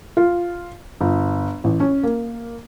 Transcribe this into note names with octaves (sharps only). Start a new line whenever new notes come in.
F4
G1
A1
C#4
A#3